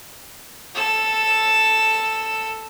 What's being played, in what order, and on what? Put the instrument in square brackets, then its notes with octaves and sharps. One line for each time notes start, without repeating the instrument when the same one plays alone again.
[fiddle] A4 E6